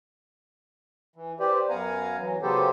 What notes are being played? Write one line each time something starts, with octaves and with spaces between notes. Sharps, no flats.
E3
G4 B4 C5 D5
F#2 B3 F5 F#5 G#5 A#5
E3 F#3
C#3 F#3 B3 G4 A4 C5